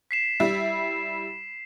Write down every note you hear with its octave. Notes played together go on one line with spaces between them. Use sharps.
B6 C7 E7
G3 E4